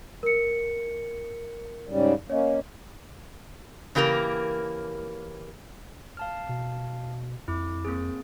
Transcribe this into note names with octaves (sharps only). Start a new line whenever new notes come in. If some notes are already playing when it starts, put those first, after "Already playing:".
A#4 C#7
G#2 C#3 G3
A#3 C#4 C#5 D#5
C#3 E3 A#3 G4 A#4
F5 A5 F6
B2
F2 E4 D6
A#3 C4 G#4